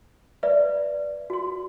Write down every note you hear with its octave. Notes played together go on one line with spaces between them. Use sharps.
B4 D5 E5
F#4 C6